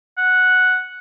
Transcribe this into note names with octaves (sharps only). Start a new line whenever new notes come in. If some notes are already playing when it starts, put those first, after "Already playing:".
F#5